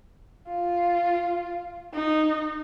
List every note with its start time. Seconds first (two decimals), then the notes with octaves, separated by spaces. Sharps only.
0.48 F4
1.94 D#4